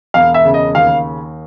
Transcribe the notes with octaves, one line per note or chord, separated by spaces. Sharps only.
E1 F5
E5
C#3
D#5
D#2 F5